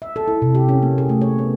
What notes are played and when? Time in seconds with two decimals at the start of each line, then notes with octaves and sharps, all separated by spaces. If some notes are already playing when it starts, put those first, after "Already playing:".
0.02 E5
0.16 A4
0.28 E4
0.42 C3
0.55 G4
0.69 C#4
0.82 A#3
0.98 G#4
1.09 A3
1.22 C#5
1.39 B3